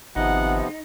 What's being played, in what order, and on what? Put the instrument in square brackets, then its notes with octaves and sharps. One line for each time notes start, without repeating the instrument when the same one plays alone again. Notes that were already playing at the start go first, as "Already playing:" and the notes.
[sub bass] G#1 [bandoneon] C3 F3 B3 [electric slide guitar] D#4 [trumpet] F#5